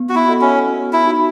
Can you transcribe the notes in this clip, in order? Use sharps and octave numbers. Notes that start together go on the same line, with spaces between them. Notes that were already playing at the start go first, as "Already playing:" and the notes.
Already playing: B3
F#4
E4
F#4 A4 D#5 F#5
C#4
B3
E4
D#4 F#4